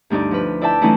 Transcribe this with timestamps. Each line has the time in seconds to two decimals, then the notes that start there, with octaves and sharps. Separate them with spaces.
0.10 D2 G2 D4 D#4 D5
0.31 F3 B4
0.61 E4 D5 E5 G5 A5
0.81 E3 F#3 A3 C#4 D#4 E4